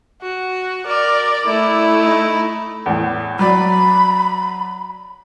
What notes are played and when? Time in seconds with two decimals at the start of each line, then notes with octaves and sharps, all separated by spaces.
0.22 F#4
0.87 A#4 D5
1.45 A3 E4
2.02 D#4
2.86 E2 A2
3.39 F#3 D5 B5